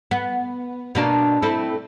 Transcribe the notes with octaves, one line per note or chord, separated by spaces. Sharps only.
B3
B2 A#3 D4
A3 C4 E4